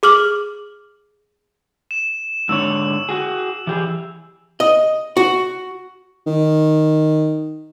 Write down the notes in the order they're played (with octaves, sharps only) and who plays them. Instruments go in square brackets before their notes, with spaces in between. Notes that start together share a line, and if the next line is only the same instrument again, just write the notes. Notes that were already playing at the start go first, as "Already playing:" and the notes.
[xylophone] G#4 D6 F6 F#7
[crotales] E7
[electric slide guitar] G#2 D3 C#5 [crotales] E6
[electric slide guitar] F#4 G#4
E3 G4 G#4
[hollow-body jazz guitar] D#5
F#4
[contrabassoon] D#3